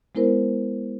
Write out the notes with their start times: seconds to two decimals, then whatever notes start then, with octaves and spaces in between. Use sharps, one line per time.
0.15 G#3 B3 E4 A#4 C5